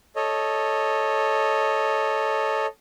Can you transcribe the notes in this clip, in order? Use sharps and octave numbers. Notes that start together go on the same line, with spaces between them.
A4 C#5 D#5